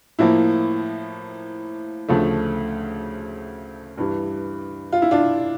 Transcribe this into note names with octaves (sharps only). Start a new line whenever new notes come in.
A2 F3 A#3 E4
D2 C#3 F3 A3
G2 E3 G3
F4
E4
D4 F4